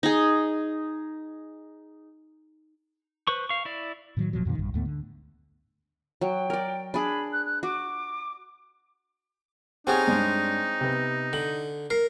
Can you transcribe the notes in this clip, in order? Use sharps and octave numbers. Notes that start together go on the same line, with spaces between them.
D#4 G#4
B4 C5 C#6
F5 C#6
E4 D5
A2 D#3 E3 F#3
D#1 A#2 F3 F#3
F2 A#2 D3 D#3
A#1 G2
D2 G#2 A3 B3
D3
F#3 G5
A#4 D5
D4 G#4 B5
F#6
F#6
F#4 D6
C4 C#4 D#4 G4 G#4 F#5 G#5
G2 G#3 D4
C3 B3
D3 F#7
A#4 C7